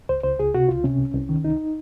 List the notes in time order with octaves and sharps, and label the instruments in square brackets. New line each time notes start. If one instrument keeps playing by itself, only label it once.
[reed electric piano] C#2 C5
C#2 C5
C#2 G#4
C3 F#4
C#2 F4
C3 C#4
C2
C2
D#3
C2 D#4